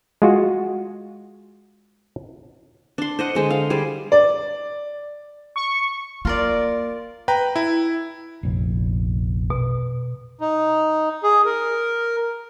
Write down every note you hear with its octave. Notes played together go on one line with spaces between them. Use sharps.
G#3 F4 F#4
D4 C6
C5 D#5 F#5
D3 G#3 C5
F5
G3 G#4 C5
D5
C#6
A#3 F4 A#4 D5
B4 G5 A#5
E4
F1 A#1
B2
D#4
G#4
A#4